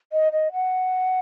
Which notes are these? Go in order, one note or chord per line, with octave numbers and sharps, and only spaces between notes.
D#5
D#5
F#5